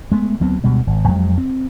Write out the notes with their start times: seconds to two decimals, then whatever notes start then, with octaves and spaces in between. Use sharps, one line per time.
0.12 G#3 A3 B3
0.40 D2 F#3 B3 C4
0.64 D2 B2 G3 G#3
0.87 G#1
1.08 F2 F#3 G#3
1.38 C4